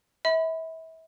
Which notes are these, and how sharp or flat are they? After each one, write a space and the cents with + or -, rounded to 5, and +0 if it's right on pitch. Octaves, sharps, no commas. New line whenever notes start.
E5 -35 B5 +15